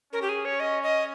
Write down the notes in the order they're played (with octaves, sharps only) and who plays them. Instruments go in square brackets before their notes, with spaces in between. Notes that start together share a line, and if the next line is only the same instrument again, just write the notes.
[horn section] C#4 [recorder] A#4
[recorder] G4
G#4
C#5
D#5
D#5